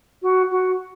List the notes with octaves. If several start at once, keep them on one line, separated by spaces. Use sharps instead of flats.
F#4
F#4